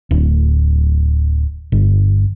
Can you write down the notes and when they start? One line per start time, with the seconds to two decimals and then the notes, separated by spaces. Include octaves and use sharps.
0.11 D1
1.72 G1